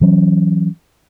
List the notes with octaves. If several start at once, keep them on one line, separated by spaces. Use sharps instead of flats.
E3 F#3 C#4